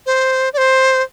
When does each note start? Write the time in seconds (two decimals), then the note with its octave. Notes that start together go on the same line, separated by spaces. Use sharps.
0.06 C5
0.53 D5
0.58 C5